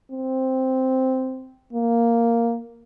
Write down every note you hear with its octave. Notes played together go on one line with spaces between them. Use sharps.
C4
A#3